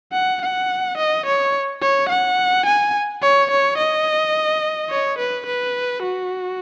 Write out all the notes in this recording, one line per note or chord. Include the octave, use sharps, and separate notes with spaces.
F#5
F#5
D#5
C#5
C#5
F#5
G#5
C#5
C#5
D#5
C#5
B4
B4
F#4